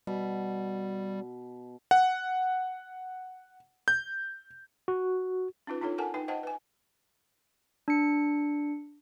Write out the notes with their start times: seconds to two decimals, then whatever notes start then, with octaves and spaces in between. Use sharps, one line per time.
0.07 B2 G3
1.91 F#5
3.88 G6
4.88 F#4
5.67 C#4 D#4 F4 B4
5.81 D4 D#4 F4 A4 C#5
5.98 A4 A#4 F#5 G#5 A5
6.14 D#4 B4 G5
6.28 C5 D#5 F#5 G5 A5
6.43 B4 G#5
7.88 D4 C#7